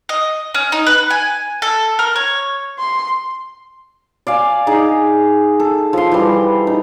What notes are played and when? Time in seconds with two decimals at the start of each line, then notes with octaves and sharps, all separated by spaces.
0.09 D#5
0.54 C#4
0.72 D#4
0.87 B4
1.10 G#5
1.62 A4
1.99 A#4
2.16 C#5
2.79 C6
4.27 D5 F5 G#5
4.67 D#4 G#4
5.60 A4
5.93 F3 C6
6.12 E3 G3
6.67 D#4